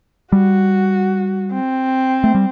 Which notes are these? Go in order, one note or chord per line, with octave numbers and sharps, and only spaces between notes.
G3 F#4
C4
A3
G3